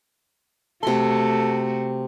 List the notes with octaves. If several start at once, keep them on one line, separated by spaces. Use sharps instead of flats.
C3 A3 F#4 A4 C6